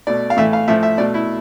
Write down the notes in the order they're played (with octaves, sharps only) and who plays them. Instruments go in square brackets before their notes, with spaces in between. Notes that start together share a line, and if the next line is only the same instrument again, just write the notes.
[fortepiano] B2 A3 D5
F5
A2 E3 A3 E5
F5
A2 F3 A3 E5
E5
B2 A3 D5
E4